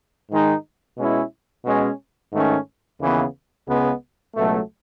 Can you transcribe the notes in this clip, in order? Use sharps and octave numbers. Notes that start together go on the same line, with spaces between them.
G#2 D#3 G#3 D#4
B2 G#3 C#4 E4
B2 G#3 C#4
G#2 D#3 A3 C#4
D#2 C#3 E3 B3
C#2 C#3 G#3 B3
C#2 B2 F#3 A3